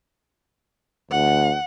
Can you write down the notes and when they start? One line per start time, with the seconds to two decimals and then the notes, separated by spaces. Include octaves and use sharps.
1.11 D2 F#5